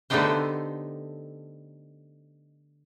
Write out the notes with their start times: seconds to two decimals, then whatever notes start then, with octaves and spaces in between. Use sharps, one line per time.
0.10 D3 A3 B3 D#4 G4 C5